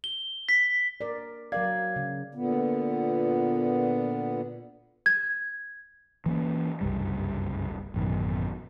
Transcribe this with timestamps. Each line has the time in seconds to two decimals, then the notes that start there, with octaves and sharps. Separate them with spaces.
0.04 G7
0.49 B6
1.01 A#4 D5
1.52 F#3 A#4 D5 F5 G#6
1.96 C#3
2.35 A#2 D3 B3
5.06 G#6
6.26 E3 A#3 C#4
6.81 F#1 C2 G2 G3
7.94 A1 F#2 B2 D#3